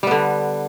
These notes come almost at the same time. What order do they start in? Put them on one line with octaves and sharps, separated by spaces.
G3 B3 D3